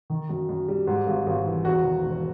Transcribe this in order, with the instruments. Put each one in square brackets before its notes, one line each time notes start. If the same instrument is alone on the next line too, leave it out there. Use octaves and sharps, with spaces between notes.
[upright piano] D#3
F#2
F#2
G3
G#2
G#1
G#1
E3
E2 F#4
D#3
E1